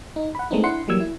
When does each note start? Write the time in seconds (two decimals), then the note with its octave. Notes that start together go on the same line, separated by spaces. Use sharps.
0.16 D#4
0.35 F#5 B5
0.51 G#3 A3 B3 C4 D4 D#4
0.63 D4 E4 F#5 C6 C#7
0.88 E3 F#3 G3 A#3 E6 G#6
1.00 E4